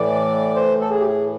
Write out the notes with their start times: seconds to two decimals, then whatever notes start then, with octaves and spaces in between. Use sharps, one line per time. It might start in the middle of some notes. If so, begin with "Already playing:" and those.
Already playing: A2 E3 D5
0.56 C5
0.80 A4
0.90 G#4
1.00 G4
1.07 G#4